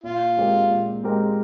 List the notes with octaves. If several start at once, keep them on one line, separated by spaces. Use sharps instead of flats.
A#2 F4
G#3 C4 G4 A#4
A#2
G#3 C4 G4 A#4